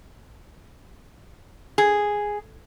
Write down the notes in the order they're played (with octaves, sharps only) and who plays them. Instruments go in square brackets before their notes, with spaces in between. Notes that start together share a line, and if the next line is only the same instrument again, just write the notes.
[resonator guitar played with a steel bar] G#4